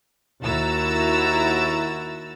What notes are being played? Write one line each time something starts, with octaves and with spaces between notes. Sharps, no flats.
D#2 E4 F#4 A#5 E6 A6